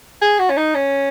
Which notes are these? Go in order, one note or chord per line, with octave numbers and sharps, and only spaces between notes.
G#4
F#4
C#4
D#4
C#4